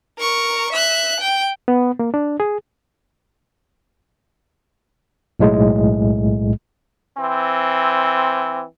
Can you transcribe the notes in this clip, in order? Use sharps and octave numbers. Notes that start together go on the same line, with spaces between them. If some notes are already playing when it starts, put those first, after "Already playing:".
A#4 C#6
E5 F#6
G5
B3
A#3
D4
G#4
B1 A2 G#3
E3 C4